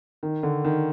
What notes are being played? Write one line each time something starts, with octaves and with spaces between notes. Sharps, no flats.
D#3
D3
D#3